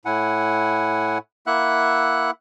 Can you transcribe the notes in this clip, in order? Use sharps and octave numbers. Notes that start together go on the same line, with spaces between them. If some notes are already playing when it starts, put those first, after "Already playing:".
A2 E4 F#5 G#5
A#3 E4 E5 F#5 F#6